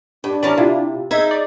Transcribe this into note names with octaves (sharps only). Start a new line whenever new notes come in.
G2 D4
E3 C#4 A#4 D5 A5
C3 E4 F4
D#4 G#4 C5 E5 G#6
D5